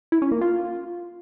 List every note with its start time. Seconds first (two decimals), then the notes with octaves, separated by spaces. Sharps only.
0.12 E4
0.22 C#4
0.32 A#3
0.41 F4